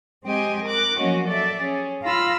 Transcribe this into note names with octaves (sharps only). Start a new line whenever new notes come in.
G#3 C4 G4 D#5 G5 G#5
A#4 D6 F#6
F3 F#3 A#3 C#4 F#4 D#5
A4 D5 E5
C#4 G#4
F4 F5 A#5 B5 E6 F6